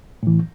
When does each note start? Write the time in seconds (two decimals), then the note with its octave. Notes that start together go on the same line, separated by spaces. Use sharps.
0.23 A2 E3